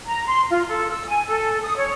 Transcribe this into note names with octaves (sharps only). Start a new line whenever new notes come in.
A#5
C6
F4
A4
E6
G#5
A4
D#6
C#5